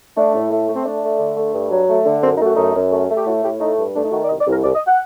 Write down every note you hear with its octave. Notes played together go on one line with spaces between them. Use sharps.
A3 D4
A2
A3
A3
C4
A3 D4
A3
D3
A3
G2
F#3
A3
D3
F#2 C4
D#4
A3
F#4
F#2 D#4
F#2
A3
A3
G4
A2 F#4
A2 G4
A3 D#4
G2
A3 D4
D#4
D#3 F#4
D5
C2 D#5
D5
C2
A#4
C2 D5
D#5
F#5